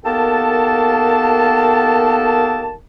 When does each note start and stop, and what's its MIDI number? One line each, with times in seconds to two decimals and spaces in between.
0.04 2.73 39
0.04 2.73 58
0.04 2.73 59
0.04 2.73 69
0.04 2.73 79
0.04 2.73 81